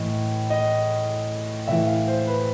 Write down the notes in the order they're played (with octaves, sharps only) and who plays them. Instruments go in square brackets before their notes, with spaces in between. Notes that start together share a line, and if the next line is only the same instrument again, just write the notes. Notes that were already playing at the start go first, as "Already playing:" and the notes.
Already playing: [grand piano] A2 E3 D#5
D#5
A2 E3 E5
F5
C5
B4